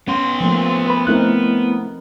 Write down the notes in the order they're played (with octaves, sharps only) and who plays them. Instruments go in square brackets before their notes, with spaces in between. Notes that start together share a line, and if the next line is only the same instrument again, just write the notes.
[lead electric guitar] B3 C6 [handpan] C#4
[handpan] F3 A3 A#3
[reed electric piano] B4 B5
[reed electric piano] A3 E4 F#6 [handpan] C4 D#4 A#4